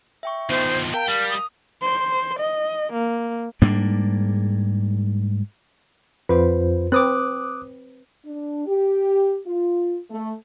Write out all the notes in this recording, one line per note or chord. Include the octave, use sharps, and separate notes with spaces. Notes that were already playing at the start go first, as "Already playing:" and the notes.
E5 G5 C#6
D#3 F3 B3 C5
A#4 F5 G5 A5 A#5
G3 F6
D#6
C5
D#5
A#3
G#2 G3 A#3 D4
F2 F4 B4 C5
C4 B4 D6 D#6 F#6
D4
G4
F4
A3